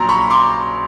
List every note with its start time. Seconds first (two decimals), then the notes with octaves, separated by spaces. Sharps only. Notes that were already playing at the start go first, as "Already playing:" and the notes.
Already playing: A#1 A#2 F#3 A#5 C6
0.09 B5 C#6
0.30 C6 D6